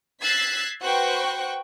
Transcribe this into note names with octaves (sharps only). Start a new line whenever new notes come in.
E6 F#6 G#6 A6 B6 C7
F#4 B4 C5 G5 C#6 F#6